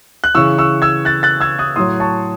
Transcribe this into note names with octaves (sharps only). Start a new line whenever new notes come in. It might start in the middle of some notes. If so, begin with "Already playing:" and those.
F#6
C#3 E3 C#6 E6
C#6 E6
E6 G#6
F#6 A6
F#6 A6
E6 G#6
D#6 F#6
A2 F#3 C6 D#6
A5 C#6